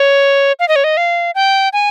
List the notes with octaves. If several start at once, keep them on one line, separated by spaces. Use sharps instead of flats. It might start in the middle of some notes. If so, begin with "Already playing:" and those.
Already playing: C#5
F5
D#5
C#5
D#5
F5
G5
G#5